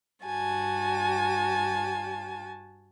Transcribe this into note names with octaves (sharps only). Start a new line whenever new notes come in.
G2 F#4 G#5 A5